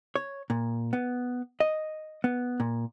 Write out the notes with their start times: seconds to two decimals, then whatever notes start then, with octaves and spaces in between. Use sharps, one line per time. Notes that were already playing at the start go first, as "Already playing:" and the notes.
0.16 C#5
0.50 A#2
0.93 B3
1.60 D#5
2.24 B3
2.60 A#2